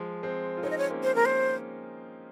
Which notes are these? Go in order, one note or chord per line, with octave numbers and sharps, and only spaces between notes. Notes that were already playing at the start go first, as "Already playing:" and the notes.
Already playing: F3 G#3
G#3 C4
F4
C4 D#4 C#5
D#5
C#5
A#3 C#4
C5
A#3 C#4 A#4
C5